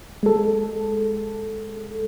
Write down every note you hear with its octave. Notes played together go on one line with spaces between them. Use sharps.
G#3 A4